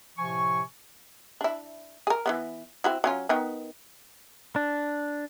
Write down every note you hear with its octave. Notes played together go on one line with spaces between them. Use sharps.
A2 C3 F3 G#5 C#6
D4 E4
G#4 A#4
E3 G#3 B3
C4 E4 F#4
F#3 C#4 F4
D#3 B3
D4